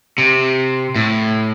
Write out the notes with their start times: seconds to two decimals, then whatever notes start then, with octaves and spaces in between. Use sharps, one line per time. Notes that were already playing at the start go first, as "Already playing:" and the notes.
0.18 C3
0.96 A2